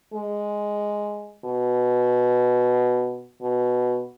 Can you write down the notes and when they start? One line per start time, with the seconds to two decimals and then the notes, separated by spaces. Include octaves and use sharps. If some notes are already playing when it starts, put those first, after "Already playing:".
0.14 G#3
1.45 B2
3.41 B2